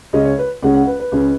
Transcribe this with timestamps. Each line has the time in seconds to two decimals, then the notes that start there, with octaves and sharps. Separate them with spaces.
0.13 C#2 C#3 G#3 C#4 D#5
0.25 C#5
0.39 B4
0.62 C#2 C#3 G#3 C#4 F#5
0.74 F#5
0.87 B4
1.00 B4
1.12 C#2 C#3 G#3 C#4